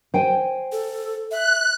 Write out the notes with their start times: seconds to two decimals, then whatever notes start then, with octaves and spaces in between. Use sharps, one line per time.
0.14 C5 G5 G#5
0.72 A4
1.31 E5 F#6